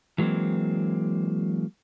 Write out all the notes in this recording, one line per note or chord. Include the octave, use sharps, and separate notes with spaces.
E3 F#3 G#3 A#3 C4